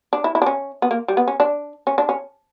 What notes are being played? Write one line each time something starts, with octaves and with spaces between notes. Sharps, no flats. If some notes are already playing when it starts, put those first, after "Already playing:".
D4
E4
E4
D4
C#4
B3
A#3
G3
B3
C#4
D4
C#4
D4
C#4